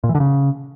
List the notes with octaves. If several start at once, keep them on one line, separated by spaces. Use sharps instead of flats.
A#2
E3
D3
C#3